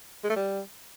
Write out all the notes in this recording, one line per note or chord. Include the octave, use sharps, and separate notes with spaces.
G#3
A3
G3